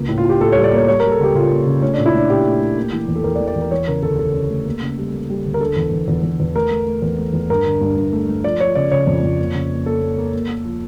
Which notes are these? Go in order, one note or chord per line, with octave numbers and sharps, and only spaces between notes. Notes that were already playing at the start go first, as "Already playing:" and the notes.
Already playing: C#2 A#3
A2
F4
A2
G4
A2 A4
C#5
G3
D5
A#3 C#5
G3 C#5
A#4
G3
A4
C#2 G4
C#2 F4
A#3
C#3
A3 C#4
D4
A#2
E4
A3 D4
A#2 G4
A3
A3
A#3
E3
E2
A4
E2 A#4
D5
E3
D5
E2
A#4
E3 C#5
C#3 A#4
D2 A4
D2 A4
C#3
A3
A#3
C#3
G3
A#3
G3
D2
A#4
D3 A4
E2
E2
E2
E2
E2
A3 A#4
A3
A3
E2
A3
E2
G2 A#4
D3
G2
G2
A3
A3
F3 D5
F3 C#5
C#3 D5
C#3 C#5
F2
F2
A#3
C#3
A#3
A#3 A4
A#3
A#3
A#3
A#3
F3